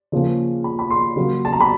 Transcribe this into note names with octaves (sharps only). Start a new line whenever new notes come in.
C#3 F3 A#3 C#4
B5
B5
C6
C#3 F#3 A#3
A5
A#5
B5